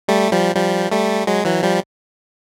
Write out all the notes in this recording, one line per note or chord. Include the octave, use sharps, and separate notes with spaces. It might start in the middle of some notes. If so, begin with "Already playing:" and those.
G3 A3
F3 G3
F3 G3
G3 A3
F#3 G#3
E3 F#3
F3 G3